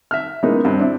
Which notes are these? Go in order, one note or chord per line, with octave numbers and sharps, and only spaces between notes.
E5 F6
C#3 E3 G#3 A#3 B3 D#4
G2 C4
C4 D4 E4